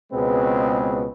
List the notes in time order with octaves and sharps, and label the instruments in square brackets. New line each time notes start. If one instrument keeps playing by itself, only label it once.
[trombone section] C#2 B2 G#3 C4 B4